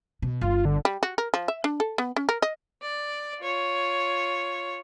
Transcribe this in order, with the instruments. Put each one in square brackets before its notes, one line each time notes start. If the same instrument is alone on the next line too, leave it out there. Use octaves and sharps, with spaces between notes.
[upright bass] B2
[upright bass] G1 [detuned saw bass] F4
[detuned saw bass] D3
[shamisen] G3
F#4
A#4
F3
E5
D4
A4
B3
C#4
A#4
D#5
[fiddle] D5
F4 C#5